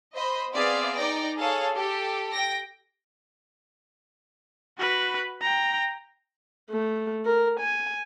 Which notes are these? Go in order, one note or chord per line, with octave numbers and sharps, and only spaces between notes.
C5 D#5 B5
B3 C4 G#4 D5 E5 F5
D#4 D5 G5 A#6
G#4 A4 C#5 F5 A5
G4 A4
G5 A#6
F#4 B4
G5 A#5
A3
A#4
G#5